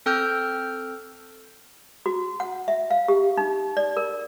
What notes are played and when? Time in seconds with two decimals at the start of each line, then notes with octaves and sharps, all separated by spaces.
0.06 C4 A4 G5 E6 F6 G6
2.06 F#4
2.40 F#5
2.68 E5
2.91 F5
3.08 G4
3.37 D#4
3.77 D5
3.97 A#4